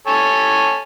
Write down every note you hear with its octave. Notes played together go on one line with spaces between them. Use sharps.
A4 C#5 G#5